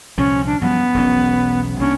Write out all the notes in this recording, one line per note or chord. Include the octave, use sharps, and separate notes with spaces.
C2 A#2 F3 C#4
D4
G2 F3 F#3 B3
E1 B1 C#4
C2 A#3 C#4 D4